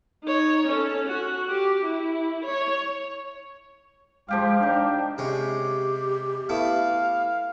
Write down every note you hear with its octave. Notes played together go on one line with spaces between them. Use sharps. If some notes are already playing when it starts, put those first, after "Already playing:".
D#4 C#5
C#4 A4
F#4
G4
E4
C#5
F3 G#3 G4 F5
D#3 D4
C3 G#3 C#4 G4
A3 B3 E4 F5